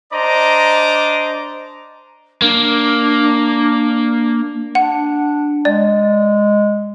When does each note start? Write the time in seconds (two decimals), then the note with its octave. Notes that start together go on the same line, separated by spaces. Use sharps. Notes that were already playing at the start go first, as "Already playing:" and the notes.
0.13 D4 C5 D5 D#5 A#5 D6
2.42 A#3 D4
4.75 D4 F#5
5.65 G#3 D5